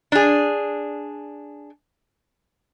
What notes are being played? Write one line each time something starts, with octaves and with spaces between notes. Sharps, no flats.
D4 G#4